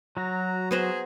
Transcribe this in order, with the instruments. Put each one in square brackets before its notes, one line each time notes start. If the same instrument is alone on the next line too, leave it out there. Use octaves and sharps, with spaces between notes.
[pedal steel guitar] F#3 F#4 [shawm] A#5
[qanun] B3 C5 A#5 [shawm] G#4